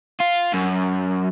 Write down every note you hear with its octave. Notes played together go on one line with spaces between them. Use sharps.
F4
F#2